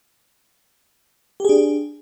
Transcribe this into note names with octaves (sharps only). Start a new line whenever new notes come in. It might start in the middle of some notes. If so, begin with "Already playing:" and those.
D4 G4 G#4